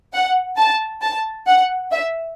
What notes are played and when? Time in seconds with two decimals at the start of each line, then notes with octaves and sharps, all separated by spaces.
0.13 F#5
0.57 A5
1.02 A5
1.47 F#5
1.92 E5